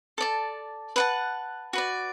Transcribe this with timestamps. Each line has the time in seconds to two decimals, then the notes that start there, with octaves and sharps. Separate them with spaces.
0.18 A4 D5 A5
0.96 B4 F#5 A5
1.73 F#4 B4 D5